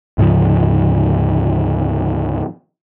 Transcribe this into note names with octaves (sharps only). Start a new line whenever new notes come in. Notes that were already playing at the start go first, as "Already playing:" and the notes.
D2 G#2 C#3 F3